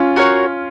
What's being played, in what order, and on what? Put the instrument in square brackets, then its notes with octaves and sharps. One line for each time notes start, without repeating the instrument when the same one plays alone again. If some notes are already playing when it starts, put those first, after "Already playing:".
Already playing: [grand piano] C#4 F4
[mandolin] F#4 A#4 C#5